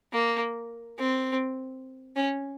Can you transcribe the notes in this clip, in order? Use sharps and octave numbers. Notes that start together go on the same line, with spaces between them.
A#3
C4
C#4